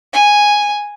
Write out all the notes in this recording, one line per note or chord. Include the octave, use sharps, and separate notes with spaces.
G#5